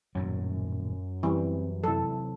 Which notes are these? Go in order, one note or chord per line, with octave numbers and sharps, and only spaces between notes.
D#1 F#2 A2 F#3
E3 G3 C4
C3 F#3 E4 A4